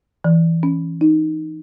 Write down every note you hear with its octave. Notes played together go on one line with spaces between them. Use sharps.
E3
C#4
D#4